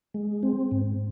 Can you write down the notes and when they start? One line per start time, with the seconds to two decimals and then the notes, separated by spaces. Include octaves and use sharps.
0.14 G#3
0.43 C4
0.71 G#2